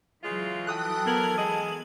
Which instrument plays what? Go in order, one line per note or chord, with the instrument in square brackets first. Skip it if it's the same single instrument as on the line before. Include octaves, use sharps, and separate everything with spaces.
[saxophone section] C#3 G#3 F4 [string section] E3 F#3
[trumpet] A4 [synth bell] G5 D#6 F#6
[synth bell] B3 G#6 F#7 [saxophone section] A#4
[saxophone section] G#3 D#5